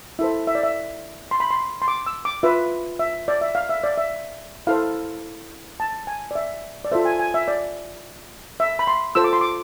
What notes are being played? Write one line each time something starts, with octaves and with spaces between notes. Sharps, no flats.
E4 A4 C5 E5
E5
D5
E5
C6
B5
C6
C6
D6
E6
D6
F4 B4 E5
E5
D5
E5
F5
E5
D5
E5
E4 A4 C5 F5
A5
G#5
D5
E5
D5
F4 A4 C5 E5
G#5
G#5
E5
D5
E5
B5
C6
F4 A4 C5 E6
D6
C6
D6